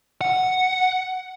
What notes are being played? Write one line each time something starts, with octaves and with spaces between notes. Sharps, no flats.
F#5